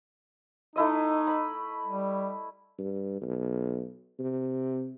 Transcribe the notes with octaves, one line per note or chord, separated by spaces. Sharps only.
A3 D#4 E4 D#5
B5
G3
G2
B1
C3